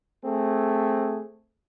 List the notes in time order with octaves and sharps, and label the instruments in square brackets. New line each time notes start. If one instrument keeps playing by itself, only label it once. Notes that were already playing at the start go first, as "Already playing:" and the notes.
[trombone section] A3 C4 G#4